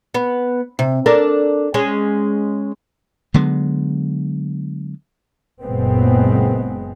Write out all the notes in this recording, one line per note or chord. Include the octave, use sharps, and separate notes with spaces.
B3
C3
D4 A4 A#4
G#3 C#4
D3 F#3 G#3 B3
F#1 A#2 G#3 B3 C4